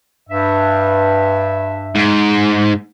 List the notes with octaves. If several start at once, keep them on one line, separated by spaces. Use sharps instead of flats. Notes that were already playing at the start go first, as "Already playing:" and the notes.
G2 E5
G#2